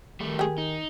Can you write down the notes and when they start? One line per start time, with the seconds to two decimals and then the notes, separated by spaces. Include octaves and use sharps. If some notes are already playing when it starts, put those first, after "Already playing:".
0.20 D#3 G3 A3
0.39 G4 G#4
0.58 D#4